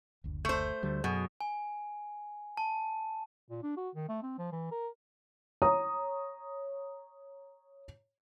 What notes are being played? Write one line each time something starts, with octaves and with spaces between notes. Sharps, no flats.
F#1 D2
A3 C5
D2 G3
F#2 B2 F#3 F#4 G#4
G#5
A5
A#2
D4
F#4
D#3
A3
C4
F3
E3
A#4
C#5 A#5 D#6